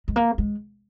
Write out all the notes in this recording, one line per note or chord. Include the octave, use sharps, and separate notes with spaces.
G#3
A#3
G#3